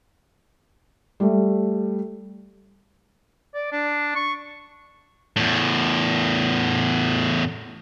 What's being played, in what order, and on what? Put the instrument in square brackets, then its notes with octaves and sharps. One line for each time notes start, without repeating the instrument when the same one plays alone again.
[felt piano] G3 A3
[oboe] D5
D4
C#6
[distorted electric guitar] E2 A2